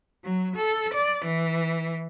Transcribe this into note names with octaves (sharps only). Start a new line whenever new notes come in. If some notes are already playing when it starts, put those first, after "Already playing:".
F#3
A4
D5
E3